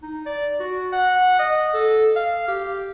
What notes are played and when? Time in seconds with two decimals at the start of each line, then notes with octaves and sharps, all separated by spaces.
0.03 D#4
0.26 D5
0.60 F#4
0.92 F#5
1.39 D#5
1.74 A4
2.16 F5
2.48 G4